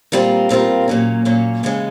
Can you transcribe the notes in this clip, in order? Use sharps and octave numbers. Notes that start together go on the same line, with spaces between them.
A#2 G3 C4 F4 A#4
A#2 G3 C4 F4 A#4
A#2 F#3 A#3 C#4
A#2 F#3 A#3 C#4
D#2 C#3 E3 G#3 C#4